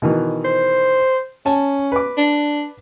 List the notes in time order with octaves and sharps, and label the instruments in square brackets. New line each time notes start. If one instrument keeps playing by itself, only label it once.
[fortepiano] B2 D#3 E3
[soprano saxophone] C5
[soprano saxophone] C#4 [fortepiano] A5
[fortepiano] B4 D6
[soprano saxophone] D4